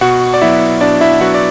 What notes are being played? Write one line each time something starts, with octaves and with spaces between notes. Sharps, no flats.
B2 F#4 F#5
D5
F#3 B3 E4 E5
B2 D4 D5
E4 E5
F#3 B3 E4 F#4 F#5
D5